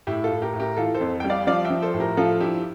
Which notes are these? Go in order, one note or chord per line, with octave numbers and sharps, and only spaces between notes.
A2 E4 G4
F4 A4
A2
G4 A#4
A2
G4 A#4
E3 F4 A4
A4 C5
F2
G3 G5
D5 F5
F3 D5 F5
E5 G5
F3
A4 C5
A2
G4 A#4
F3 F4 A4
G2 E4 G4